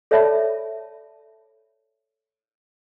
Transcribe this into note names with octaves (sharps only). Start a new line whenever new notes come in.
A4 C#5 D5 E5 A5 B5